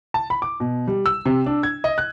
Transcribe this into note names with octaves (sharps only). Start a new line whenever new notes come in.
A5
B5
D6
B2
G3
E6
C3
D4
G#6
D#5
F#6